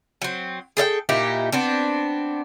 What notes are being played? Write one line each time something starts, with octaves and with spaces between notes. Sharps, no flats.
F#3 C4
G#4 A4 D#5 G5
A#2 D#4 E4 G4
B3 C4 D4